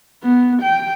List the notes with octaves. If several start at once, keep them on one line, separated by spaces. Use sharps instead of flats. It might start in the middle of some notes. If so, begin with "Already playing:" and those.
B3
G5